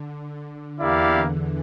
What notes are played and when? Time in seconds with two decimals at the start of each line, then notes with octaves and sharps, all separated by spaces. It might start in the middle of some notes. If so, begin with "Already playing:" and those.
Already playing: D3
0.47 D3
0.79 E2 E3 A#3 E4 G4 D5 F5
1.12 D3